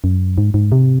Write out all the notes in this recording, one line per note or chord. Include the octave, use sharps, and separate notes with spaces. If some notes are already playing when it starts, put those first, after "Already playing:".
F#2
G#2
G#2
C3